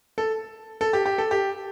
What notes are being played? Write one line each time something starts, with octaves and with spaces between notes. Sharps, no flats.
A4
A4
G4
G4
A4
G4